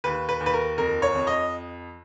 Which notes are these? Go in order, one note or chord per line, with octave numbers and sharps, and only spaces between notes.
D#2 B4
B4
D#2
B4
A#4
F2 A#4
C#5
F2
D#5